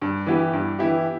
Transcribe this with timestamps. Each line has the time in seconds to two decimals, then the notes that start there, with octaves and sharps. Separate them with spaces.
0.02 G2
0.27 E3 B3 E4 G4
0.53 G2
0.79 E3 B3 E4 G4